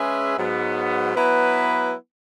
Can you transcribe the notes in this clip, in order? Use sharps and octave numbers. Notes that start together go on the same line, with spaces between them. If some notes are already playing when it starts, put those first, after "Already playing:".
Already playing: G#3 C#4 G#4 B4 E5
G#2 F#3 B3
F#3 B3 E4 B4